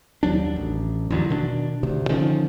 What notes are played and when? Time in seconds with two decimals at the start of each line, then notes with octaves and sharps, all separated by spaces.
0.23 D#2 F#3 D4
0.56 A1
1.10 A1 E2 D3 F#3
1.29 B2 D#3 C#4 D4
1.83 D2 C3
2.09 D3 D#3 F3 C#4